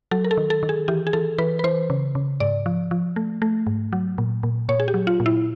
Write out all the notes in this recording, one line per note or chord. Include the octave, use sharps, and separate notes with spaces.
F#3 A4
A#4
A4
D#3
A4
D#3
G#4
E3 G4
G#4
E3 A4
E3 B4
B4
E3 C5
C#3
C#3
G#2 D5
F3
F3
A3
A3
G#2
F#3
A#2
A#2
A#2 C#5
G#4
G4
F#3
F4
A#2
E4